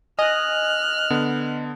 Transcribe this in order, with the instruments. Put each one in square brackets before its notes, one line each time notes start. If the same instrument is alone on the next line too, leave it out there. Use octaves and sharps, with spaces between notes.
[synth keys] D#5 [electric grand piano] G#5 [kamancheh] F6 F#6
[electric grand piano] D3 B3